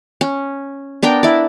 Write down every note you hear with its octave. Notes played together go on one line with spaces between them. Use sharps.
C#4
B3 D4 A#4 G5
E4 D5